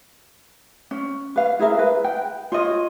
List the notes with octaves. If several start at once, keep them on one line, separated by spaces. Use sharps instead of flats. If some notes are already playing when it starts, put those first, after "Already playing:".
C#4
B4 F5
E4 G#4 A#4 E5
B4
G5
F4 C#5 D#5